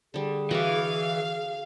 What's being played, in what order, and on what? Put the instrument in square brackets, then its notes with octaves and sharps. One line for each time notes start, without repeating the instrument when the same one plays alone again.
[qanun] D3 G3 [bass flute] G#4
[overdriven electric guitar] E3 [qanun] F#4 D5 [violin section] F5